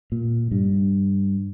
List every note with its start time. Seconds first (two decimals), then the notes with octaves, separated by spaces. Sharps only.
0.12 A#2
0.51 G2